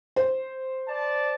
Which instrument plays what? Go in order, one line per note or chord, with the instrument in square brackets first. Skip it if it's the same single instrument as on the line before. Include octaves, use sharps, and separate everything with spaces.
[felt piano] C5
[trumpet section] D5 A5